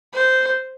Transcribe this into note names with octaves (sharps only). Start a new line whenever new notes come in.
C5